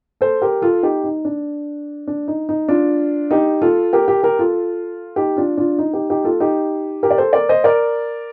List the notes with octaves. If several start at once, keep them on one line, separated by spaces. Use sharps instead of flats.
A4 C5
G4 A#4
F4 A4
D#4 G4
D#4
D4
D4
D#4
D#4
D4 F4
D#4 G4
F4 A4
G4 A#4
G4 A#4
G4 A#4
F4 A4
D#4 G4
D4 F4
D4 F4
D#4
D#4 G4
D#4 G4
F4 A4
D#4 G4
G4 A#4
D5
A4 C5
A#4 D5
C5 D#5
A#4 D5